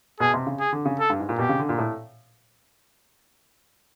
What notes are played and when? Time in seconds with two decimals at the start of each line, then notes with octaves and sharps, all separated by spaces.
0.20 B2 G#4
0.34 C3
0.47 C#3
0.60 G#4
0.73 D3
0.85 C#3
1.00 A4
1.10 G2
1.20 G#2
1.29 A#2
1.39 B2 G4
1.49 C#3
1.59 D3
1.69 A#2
1.78 A2